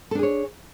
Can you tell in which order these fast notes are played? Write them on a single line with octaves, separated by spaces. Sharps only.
A4 D4 G#4 C#5